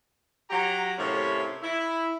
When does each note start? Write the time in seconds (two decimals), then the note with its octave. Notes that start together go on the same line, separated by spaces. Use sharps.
0.51 F#3 G4 A#5
0.98 A2 C3 A#3 C#4 F4 C#5
1.63 E4